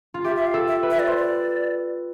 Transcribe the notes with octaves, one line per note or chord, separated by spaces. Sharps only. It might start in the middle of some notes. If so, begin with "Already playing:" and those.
F4
G4 E5
E5
F5
A4
E5
B4
E5
D5
C5
D5